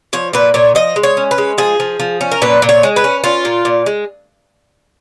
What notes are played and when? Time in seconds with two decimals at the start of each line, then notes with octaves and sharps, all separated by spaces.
0.13 F3 C#5
0.33 A#2 B4
0.54 A#2 C#5
0.75 F3 D#5
0.96 G#3
1.03 C#5
1.17 C#4
1.31 B4
1.38 G#3
1.58 F3 G#4
1.80 F3
2.00 F3
2.21 C#4
2.31 A#4
2.42 A#2 B4
2.62 A#2
2.69 C#5
2.83 G#3
2.96 B4
3.04 C#4
3.24 C#4 F4
3.45 A#2
3.65 A#2
3.86 G#3